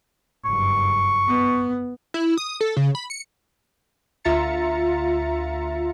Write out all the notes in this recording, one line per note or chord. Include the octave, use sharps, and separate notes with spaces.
F#1 G2 C#6
B3
E4
D#6
A4
C#3
B5
C#7
D2 F4 E5 A#5 A6 C#7